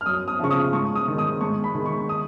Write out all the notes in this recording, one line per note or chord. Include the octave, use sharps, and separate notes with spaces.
F6
F#2 D#6
D#6
C#3 F3 C#6
D#6
G#2 C#6
D#6
D#3 G#3
D#6
G#2 C#6
B5
D#3 G#3
C#6
D#6